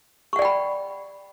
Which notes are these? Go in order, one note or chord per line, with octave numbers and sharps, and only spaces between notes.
D5 F#5 G5 B5 C#6